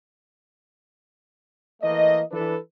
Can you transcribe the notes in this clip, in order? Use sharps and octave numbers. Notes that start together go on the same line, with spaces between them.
E3 A3 A#3 D#5
E3 D4 A4 B4